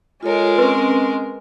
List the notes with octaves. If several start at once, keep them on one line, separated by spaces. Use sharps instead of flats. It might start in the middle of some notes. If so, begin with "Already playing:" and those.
G#3 F4 A4 A#4 C#5
C4 C#4 B4